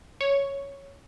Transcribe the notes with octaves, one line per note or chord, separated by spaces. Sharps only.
C#5